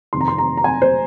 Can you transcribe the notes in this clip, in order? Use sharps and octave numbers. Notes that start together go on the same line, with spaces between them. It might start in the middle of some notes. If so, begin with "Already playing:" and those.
F2 C3 D#3 C6
A#5
C6
A#5
A#5
G#5
C5